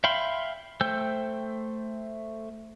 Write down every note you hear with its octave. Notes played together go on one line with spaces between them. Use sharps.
E5 F5 G5 B5 C6
A3 C5 G5 E6 G6